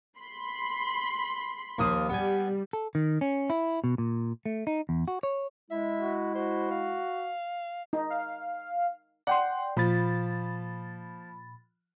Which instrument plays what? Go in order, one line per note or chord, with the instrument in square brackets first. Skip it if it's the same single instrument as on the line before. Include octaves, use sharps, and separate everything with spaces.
[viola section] B5 C6
[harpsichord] D#2 F3 D#6
[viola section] G3 [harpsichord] B3 G#5
[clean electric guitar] A4
D#3
C#4
E4
B2
A#2
A3
D#4
E2
F#4
C#5
[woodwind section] G#3 E4 [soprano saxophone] E5
[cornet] F#4
[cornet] F#4 [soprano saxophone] C5
[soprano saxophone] F5
[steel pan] D#4
[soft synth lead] F5
[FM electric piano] D5 G5 C6 [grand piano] F#5
[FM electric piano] A#2 B5 A6 [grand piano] F3